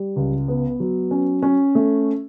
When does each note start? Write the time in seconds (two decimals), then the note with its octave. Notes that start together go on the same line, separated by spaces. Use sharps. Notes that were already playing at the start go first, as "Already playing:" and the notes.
Already playing: G3
0.16 C#2
0.48 B3
0.80 F#3
1.11 C#4
1.42 C#4
1.75 A3